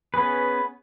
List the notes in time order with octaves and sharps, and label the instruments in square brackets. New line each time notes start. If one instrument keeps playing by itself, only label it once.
[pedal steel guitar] B3 C#4 G#4 B4